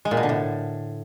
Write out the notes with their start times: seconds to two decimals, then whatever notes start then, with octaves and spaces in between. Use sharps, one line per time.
0.05 G#3
0.11 A#2
0.17 B2
0.23 D3
0.29 A2